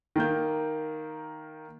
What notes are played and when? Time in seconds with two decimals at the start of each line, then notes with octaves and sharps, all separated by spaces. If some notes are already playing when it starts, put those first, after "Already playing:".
0.16 D#3 A#3 G6